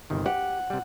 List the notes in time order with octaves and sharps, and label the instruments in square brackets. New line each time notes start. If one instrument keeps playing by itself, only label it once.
[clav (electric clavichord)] G1 C3 D#3
[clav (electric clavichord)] G4 [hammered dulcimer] F#5
[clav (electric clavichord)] C3 G3